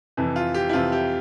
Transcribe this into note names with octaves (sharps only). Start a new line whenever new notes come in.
F2 C3 E3
F4
G4
E4
F2 C3 E3 F4
G4